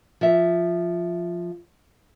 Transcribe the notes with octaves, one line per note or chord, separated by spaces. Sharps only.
F3 E5